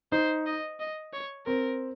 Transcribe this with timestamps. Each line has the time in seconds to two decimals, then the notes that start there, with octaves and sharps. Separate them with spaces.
0.12 D#4 C5
0.46 D#5
0.80 D#5
1.13 C#5
1.47 C4 A#4